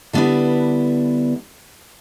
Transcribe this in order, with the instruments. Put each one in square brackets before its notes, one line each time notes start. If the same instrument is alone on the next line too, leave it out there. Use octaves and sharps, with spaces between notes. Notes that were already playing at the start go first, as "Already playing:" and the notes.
[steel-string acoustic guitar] D3 G3 B3 D4 E4 B4